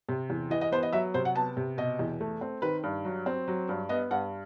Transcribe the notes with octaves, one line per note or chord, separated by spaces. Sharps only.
C3
E2
E3 D#5
D#5
B3 C5
D#5
F#3 E5
C3 C5
F#5
B3 A5
C3
B2 D#5
E2
A3
C4
D#3 B4
G2
F#3
C4
F#3
G2
B3 D#5
G2 F#5